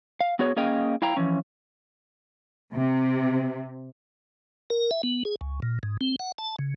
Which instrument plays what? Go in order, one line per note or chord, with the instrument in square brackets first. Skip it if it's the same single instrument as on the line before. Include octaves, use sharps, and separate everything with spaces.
[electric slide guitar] F5
B3 F#4 G#4 C#5
A#3 C#4 G#4 D#5 F5 G5
E4 F5 G5 A#5
E3 F3 C#4
[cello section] C3
[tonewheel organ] A#4
E5
B3
G#4
C#2
A#2
G#2
C4
F#5
A5
C#3